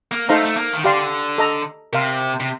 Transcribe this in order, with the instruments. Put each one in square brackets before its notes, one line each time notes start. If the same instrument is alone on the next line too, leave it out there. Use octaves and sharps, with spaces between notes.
[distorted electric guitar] A#3
[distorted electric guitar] A3 [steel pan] D#4 A4 C5 F5 A#5
[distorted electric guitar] A3
A#3
D#3
[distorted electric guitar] D3 [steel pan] G4 D5 F5 C6
[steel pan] A4 D#5 A#5
[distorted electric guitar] C3 [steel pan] A#4 F5 C6
[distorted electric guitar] C3